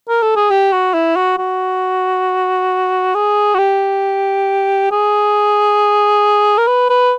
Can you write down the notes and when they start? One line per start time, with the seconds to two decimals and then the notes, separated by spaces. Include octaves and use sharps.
0.09 A#4
0.23 A4
0.36 G#4
0.50 G4
0.72 F#4
0.94 E4
1.16 F#4
1.38 F#4
3.15 G#4
3.54 F#4
3.59 G4
4.92 G#4
6.58 A#4
6.67 B4
6.90 B4